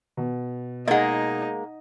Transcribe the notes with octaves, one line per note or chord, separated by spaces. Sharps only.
B2
G#3 A#3 D#4 D#5 F#5